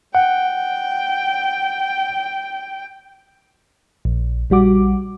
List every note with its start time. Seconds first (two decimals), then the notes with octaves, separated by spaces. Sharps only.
0.15 F#5 G5
4.05 A#1
4.50 A#1 G3 F#4 D6